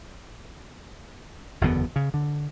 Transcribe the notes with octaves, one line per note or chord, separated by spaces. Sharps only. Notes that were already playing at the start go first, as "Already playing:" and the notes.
F#1 E2 D3 B3
C#3
D3